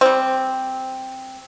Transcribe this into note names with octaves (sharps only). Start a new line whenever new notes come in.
G3 C4